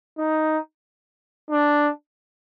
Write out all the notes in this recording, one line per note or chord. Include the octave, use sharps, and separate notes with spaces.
D#4
D4